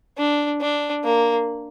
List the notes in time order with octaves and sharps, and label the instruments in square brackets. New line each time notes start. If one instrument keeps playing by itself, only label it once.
[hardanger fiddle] D4
D4
A#3